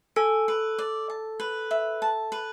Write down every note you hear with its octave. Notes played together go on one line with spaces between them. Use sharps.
A4 G#5
B4
D5
A5
B4
E5
A5
B4